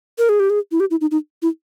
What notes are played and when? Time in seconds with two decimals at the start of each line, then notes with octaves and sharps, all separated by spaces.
0.18 A#4
0.29 G#4
0.40 G4
0.50 G#4
0.72 E4
0.80 G4
0.91 E4
1.01 D#4
1.11 D#4
1.42 E4